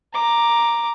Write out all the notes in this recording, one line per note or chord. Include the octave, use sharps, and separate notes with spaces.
A#5 D6